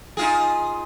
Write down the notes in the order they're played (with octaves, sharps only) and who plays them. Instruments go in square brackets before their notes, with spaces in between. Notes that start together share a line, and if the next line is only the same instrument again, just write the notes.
[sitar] D#4 F4 G#4